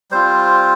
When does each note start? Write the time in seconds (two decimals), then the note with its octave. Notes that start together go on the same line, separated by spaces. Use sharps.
0.11 G3 C4 F4 C5